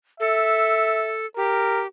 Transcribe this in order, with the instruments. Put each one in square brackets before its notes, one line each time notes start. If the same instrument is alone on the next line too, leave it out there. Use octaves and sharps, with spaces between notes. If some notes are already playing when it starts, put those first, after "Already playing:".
[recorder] A4 [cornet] E5
[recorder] G4 [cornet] A#4